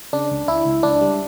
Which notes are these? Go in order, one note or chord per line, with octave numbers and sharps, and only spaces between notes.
C#3 D4
C#2
C#2 E4
C#2
C#2 D4
G3